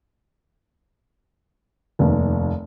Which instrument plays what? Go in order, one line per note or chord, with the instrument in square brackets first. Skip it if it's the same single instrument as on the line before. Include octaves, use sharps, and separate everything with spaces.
[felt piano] F1 D#2